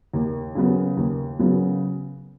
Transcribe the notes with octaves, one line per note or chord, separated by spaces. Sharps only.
D#2
C#3 F#3 B3
D#2
C#3 F#3 B3